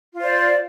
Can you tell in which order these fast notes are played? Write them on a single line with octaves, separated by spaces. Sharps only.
F4 C5 D5